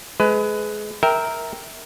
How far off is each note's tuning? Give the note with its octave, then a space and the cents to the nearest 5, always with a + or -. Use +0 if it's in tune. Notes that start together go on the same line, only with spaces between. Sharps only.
G#3 +25 B4 +30
A#4 +0 E5 -20 G5 +0